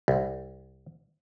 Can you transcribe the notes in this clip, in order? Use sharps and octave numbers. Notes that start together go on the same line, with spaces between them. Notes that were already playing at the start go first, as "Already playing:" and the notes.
C2